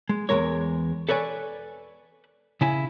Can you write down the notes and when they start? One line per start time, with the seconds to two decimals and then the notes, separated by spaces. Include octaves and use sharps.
0.09 G#3
0.29 E2 B2 G#3 A#4 C#5
1.09 A4 B4 C#5 D5 G#5
2.61 C#3 E4 G#5